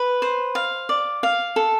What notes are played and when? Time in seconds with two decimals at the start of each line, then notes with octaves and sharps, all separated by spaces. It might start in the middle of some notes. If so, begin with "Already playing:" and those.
Already playing: B4
0.22 C5
0.55 F5
0.89 D5
1.23 F5
1.56 A4